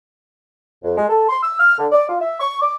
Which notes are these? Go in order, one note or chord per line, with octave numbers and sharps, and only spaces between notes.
F2
G#3
A4
C6
E6
F6
D3
D5
F4
E5
C#6
D6